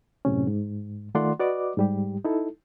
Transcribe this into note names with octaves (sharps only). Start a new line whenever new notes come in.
F#2 A2 C3 C#4
G#2
D#3 A3 F4 D5 F#5 C6
F#4 B4 D5 D#5 F#5 D6
G#2 G3 G4
D#4 E4 A4